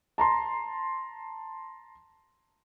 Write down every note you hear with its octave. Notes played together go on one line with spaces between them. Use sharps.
A5 A#5 C6